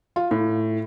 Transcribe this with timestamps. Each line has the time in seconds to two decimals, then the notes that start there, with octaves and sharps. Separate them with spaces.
0.16 F4
0.31 A2